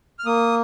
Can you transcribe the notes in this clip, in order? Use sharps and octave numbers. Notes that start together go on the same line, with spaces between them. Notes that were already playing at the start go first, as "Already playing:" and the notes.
F6
A#3 D#6